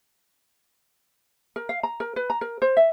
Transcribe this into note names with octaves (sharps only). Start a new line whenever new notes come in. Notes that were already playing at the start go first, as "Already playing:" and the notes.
A#4
F5
A#5
A#4
B4
A#5
A#4
C5
E5